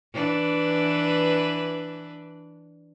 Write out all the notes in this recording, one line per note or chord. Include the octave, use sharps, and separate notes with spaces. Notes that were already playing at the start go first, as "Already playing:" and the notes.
E3 D4 B4